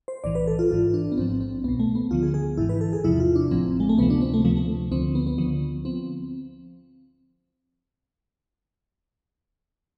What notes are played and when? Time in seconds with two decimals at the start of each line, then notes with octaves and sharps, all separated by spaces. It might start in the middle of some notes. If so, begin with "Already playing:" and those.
0.08 C5
0.24 B1 A2 E3 D5
0.35 B4
0.47 A4
0.59 F4
0.71 G#1 G#2 E3 F4
0.94 D4
1.12 B3
1.18 A1 G#2 F3 C4
1.40 C4
1.64 C2 B2 B3
1.80 A3
1.95 B3
2.11 D2 D3 F3 F4
2.23 G#4
2.34 G#4
2.57 G#1 G#2 E3 E4
2.69 B4
2.81 A4
2.93 G#4
3.04 E2 C3 F3 E4
3.20 F4
3.36 D4
3.51 A1 A2 F3 C4
3.80 G#3
3.89 A3
3.98 D2 C3 F3 B3
4.10 D4
4.21 C4
4.34 A3
4.44 D2 C3 F3 A3
4.57 A3
4.92 D2 D3 F3 C4
5.15 B3
5.27 B3
5.38 D2 D3 F3
5.85 F3 C4